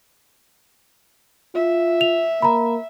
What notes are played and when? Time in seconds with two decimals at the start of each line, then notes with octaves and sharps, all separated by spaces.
1.55 F4 E5
2.01 F7
2.42 A#3 A#5 B5